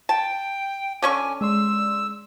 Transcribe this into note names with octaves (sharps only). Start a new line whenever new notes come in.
G5 A5
D3 C#4 G#5 C#6 D6
G#3 D5 C6 E6